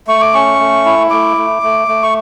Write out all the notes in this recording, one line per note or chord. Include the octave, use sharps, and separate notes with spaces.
A3 C#6
D6
C#4 C#6
A3
E4
A3 D6
A3
A3
A3
C#6